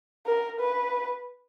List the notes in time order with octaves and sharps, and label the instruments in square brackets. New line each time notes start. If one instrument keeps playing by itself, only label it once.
[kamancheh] A#4
B4